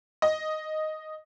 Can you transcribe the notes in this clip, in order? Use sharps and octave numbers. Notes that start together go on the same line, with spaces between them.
D#5